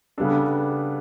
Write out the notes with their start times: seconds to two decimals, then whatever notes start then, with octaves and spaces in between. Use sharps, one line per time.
0.18 C#3 G3 B3 D4 A4